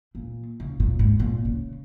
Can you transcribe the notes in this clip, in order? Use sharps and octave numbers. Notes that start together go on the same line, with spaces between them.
A#2
C#3
A#2
G#2
A#2
C#3